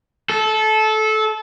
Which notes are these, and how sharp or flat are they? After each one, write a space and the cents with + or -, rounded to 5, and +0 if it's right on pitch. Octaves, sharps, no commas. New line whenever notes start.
A4 -20